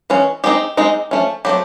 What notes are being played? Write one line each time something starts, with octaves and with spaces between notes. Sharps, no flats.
E3 G#3 C#4
G#3 C4 D#4 G4
G#3 C4 D#4
F3 A3 C#4
F#3 A3 C4 G4